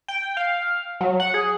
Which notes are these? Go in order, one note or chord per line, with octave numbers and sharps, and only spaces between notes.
G5
F5
F#3
F#5
G#4